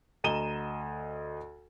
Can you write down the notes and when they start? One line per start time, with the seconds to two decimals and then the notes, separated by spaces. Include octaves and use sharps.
0.24 D2 D#5 A#5 D#7 E7 G7